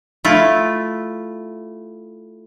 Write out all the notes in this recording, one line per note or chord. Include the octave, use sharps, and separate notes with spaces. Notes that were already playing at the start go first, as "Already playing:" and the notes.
A3 E4 F4